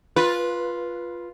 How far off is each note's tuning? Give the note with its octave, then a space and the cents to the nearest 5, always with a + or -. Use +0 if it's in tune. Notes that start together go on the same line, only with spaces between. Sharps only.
F4 +0 B4 -15